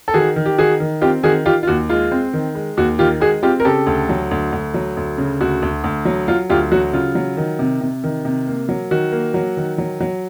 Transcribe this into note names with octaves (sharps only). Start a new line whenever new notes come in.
A4
D#3 F#4 G#4
D#3
G4
D#3 F#4 G#4
D#3
C4 F4 G4
D#3 F#4 G#4
D#3 F4 G4
F4
D#2 F#4
G#3 F4
C4
D#3
G#3
D#2 F#4
D#3 F4 G4
G#3 F#4 G#4
C4 F4 G4
A#4
C#3 G4 A4
D2
F#3
D2
D2
F#3
D2
C#3
D2 F#4
D2
D2
F#3
F#3 F4
D2 F4 G4
F#3 F#4
C#3 F4
F#3
D#3
C3
C3
D#3
C3
A#3
F#3
D#3 F#4
A#3
F#3
D#3
F#3
F#3